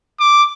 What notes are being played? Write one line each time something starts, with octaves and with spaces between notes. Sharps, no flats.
D6